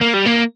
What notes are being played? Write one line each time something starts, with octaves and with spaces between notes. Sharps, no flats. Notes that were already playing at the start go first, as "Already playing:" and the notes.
A#3
G3
A#3